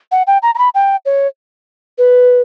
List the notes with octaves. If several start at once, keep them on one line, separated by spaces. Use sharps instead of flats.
F#5
G5
A#5
A#5
B5
G5
C#5
B4